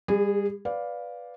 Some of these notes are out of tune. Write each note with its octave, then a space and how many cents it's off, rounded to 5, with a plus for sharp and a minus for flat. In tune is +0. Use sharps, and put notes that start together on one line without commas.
G3 +35 G#4 -15
B4 +0 D5 -10 F5 +10